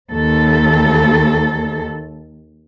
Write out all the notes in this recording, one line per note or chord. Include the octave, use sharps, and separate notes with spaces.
D#2 A4